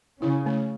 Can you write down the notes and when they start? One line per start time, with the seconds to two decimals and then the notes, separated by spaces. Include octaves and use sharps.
0.22 C#3 C#4 E4
0.46 A3